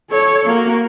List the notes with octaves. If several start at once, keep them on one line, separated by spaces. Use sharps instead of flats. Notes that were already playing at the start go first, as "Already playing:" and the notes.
A4 C#5
A#3 F#4